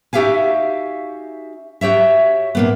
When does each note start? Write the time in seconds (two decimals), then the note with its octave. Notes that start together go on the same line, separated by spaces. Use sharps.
0.13 D#4 F#4 G4 E5 F5 G#5
1.81 F#4 G4 C#5 E5
2.55 A#2 A#3 B3